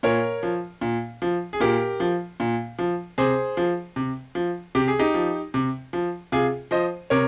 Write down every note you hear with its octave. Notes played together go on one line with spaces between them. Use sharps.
A#2 A#4 C#5
F3
A#2
F3
G#4
A#2 G4 A#4
F3
A#2
F3
C3 G#4 C5
F3
C3
F3
C3 G4
G#4
D#4 G4
F3
C3
F3
C3 F4 G#4
F3 C5 D#5
C3 A#4 C#5